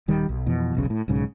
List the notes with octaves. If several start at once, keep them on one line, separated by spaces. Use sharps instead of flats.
D#1 D#3 G3
B1
F2 B2 E3
E1 B1 C#3
A2
B1 G#2 C#3